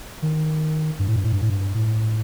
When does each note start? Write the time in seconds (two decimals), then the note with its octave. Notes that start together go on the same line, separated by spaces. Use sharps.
0.22 D#3
0.99 G2
1.07 A2
1.16 G2
1.24 A2
1.32 G2
1.41 A2
1.50 G2
1.74 A2